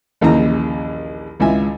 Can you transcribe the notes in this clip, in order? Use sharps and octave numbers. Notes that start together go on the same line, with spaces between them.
A#1 D#2 C#3 E3 A#5
G#1 C#2 E4 F4 E5 G#5